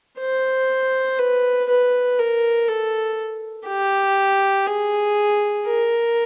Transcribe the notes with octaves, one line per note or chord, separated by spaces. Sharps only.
C5
B4
B4
A#4
A4
G4
G#4
A#4